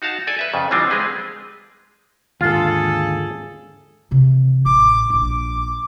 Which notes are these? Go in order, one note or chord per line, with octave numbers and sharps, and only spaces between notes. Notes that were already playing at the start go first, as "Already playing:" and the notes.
D#4 F#4 F5 A5
A4 D5 G#5
B4 E5
F2 C#3
D3 E3 F3 G3 C4 D4
G#3 C4 G#4 B4
D#2 G#2 D3 F4 G#4 A4
C3 E3
A1 D6
A#1 D4 D6